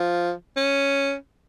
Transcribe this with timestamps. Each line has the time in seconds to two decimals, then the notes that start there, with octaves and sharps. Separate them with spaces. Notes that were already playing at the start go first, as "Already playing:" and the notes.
Already playing: F3
0.57 C#4